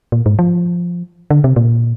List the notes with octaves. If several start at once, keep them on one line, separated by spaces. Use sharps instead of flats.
A#2
G#2
F3
D3
C3
A#2